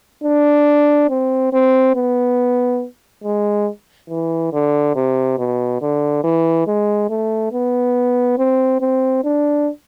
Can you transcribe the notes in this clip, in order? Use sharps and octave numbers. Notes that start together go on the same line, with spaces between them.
D4
C4
C4
B3
G#3
E3
D3
C3
B2
D3
E3
G#3
A3
B3
C4
C4
D4